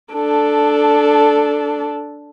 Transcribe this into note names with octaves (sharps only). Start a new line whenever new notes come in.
D4 A4